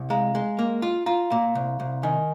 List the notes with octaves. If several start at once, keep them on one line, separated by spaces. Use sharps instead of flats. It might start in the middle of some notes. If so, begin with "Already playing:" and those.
Already playing: C2
G#3 F5 A#5
G#3
A#3
F4
F4 F5 A#5
A#2 F5 A#5
C2
C2
D#3 D#5 G#5